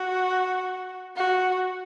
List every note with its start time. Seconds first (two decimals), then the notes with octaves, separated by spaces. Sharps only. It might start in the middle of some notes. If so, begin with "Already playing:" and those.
Already playing: F#4
1.16 F#4